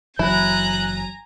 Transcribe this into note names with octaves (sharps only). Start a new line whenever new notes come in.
F#1 E3 F#3 E4 G#5 A#5 F#6